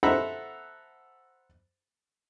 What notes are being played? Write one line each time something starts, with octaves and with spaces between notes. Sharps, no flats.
A4 C5 E5 F#5 A#5 B5